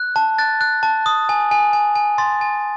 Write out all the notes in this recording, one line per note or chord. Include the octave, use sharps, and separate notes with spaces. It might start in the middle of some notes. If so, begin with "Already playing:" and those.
Already playing: F#6
A5
F#6 A6
F#6
A5
D#6
G#5
G#5
G#5
G#5
C6 A6
G#5